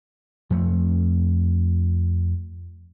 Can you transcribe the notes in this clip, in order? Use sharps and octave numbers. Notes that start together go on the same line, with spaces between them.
F2 F3 A3